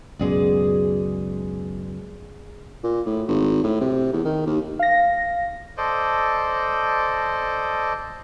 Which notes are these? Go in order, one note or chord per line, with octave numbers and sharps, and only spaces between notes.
C#2 F#2 B2 G#3 G#4 D5
A#2
A2
G#1
A2
C3
E2
D#3
D#2
F5 A#6
A4 C5 D5 D#5